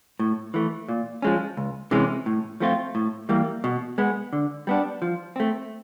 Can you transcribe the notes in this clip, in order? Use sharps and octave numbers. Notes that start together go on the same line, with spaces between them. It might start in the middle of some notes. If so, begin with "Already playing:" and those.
A2
E3 A3
A#2
F3 G#3 C#4
C#2
C3 E3 G#3 C#4
A2
F3 A3 C4 F4
A2
E3 G3 A#3
B2
G#3 B3
D3
G3 B3 D4
F3
A3 C4